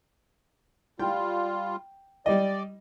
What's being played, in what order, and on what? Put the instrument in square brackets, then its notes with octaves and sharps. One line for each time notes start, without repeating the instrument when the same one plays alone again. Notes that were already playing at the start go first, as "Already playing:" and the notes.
[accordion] G3 F4 [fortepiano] G5
[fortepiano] G3 D#5 [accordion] D5